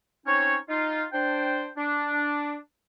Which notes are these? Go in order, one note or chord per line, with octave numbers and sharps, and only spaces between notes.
C4 C#4 D#4 C#5
D#4 F4
D4 C5 G5
D4